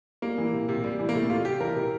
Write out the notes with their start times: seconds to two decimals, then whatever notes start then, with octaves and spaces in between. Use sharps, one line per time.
0.22 G3 A#3
0.38 E3
0.53 C3
0.69 C3
0.84 G3
0.99 E3
1.09 A#3
1.14 C3 A3
1.30 C3 F4
1.45 G3 G4
1.61 E3 A#4
1.76 C3